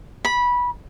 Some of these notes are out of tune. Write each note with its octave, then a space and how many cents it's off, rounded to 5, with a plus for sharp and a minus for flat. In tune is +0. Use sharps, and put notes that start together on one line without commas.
B5 -15